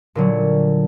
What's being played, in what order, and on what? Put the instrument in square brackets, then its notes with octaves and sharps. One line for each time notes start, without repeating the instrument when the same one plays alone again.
[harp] A#2 D3 F#3